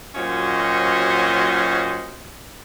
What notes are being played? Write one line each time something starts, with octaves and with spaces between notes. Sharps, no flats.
A#2 F#3 C#4 F#4 C5 D#5